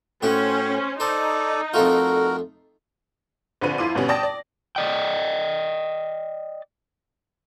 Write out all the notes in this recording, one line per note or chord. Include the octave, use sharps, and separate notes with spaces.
A2 C#4 F#4 C5 G5
D#4 A4 C5 D5
F2 A3 F4 F#4 A#4
A#1 D3 C4 B4 C5 D#7
F2 E4 F5 C6 D6 D#7
D2 G2 B2 G3 B3 C#4
D5 G5 A5 D#6 A#6
D5
D5 D#5 G5